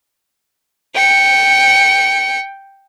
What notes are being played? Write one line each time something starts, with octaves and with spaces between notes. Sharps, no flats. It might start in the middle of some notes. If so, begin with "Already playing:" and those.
G5 C#7